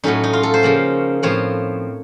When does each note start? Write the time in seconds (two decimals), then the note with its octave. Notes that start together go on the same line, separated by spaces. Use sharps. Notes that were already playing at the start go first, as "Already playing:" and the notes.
0.04 A2 F#3 A3 C#4 D#4
0.24 D#4
0.33 F4
0.43 A4
0.54 C5
0.63 C#3 F3 A#3 C#4
1.23 A2 F3 C4 C#5